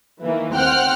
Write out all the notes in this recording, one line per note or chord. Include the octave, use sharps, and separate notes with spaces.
D#3 E3 A#3
D#2 C4 F#5 G5 F6 F#6